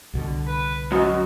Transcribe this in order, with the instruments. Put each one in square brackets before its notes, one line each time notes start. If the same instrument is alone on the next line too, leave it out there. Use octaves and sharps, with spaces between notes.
[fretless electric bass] C2 B2 D3
[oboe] B4
[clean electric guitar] F#2 [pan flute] F#4 [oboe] D#5